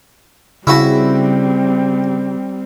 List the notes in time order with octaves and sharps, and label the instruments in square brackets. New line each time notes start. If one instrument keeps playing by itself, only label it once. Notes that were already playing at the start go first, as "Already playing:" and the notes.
[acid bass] C#3 [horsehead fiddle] G3 C4 [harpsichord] E4 F#4